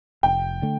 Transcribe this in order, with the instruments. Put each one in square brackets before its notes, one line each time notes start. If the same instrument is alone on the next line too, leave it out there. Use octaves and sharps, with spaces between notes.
[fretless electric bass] F1 [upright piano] G5
[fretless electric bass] D3 A3